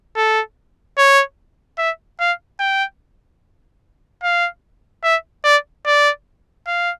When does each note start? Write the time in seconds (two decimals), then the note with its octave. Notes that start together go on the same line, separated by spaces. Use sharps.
0.16 A4
0.98 C#5
1.78 E5
2.20 F5
2.59 G5
4.23 F5
5.03 E5
5.44 D5
5.85 D5
6.67 F5